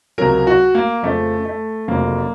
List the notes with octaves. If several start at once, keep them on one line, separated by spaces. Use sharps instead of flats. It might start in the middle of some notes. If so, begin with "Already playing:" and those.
C#2 C3 F#3 A#4
F#4
A#3
F2 C#3 F3 A3
A3
F1 F2 C#3 F#3 A#3